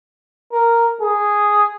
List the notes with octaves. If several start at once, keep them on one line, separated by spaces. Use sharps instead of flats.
A#4
G#4